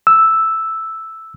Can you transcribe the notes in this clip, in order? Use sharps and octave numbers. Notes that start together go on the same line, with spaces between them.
E6